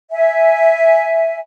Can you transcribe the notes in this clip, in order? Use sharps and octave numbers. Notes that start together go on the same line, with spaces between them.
E5 G#5